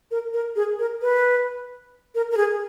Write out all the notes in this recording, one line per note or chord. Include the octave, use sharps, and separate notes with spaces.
A#4
A#4
G#4
A#4
B4
A#4
A#4
G#4